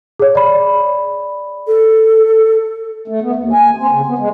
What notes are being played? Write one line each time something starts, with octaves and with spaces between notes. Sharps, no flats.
G#4 C#5
D5 B5
A4
A3
B3
D#2
G#5
C4
C#3
B3
G#3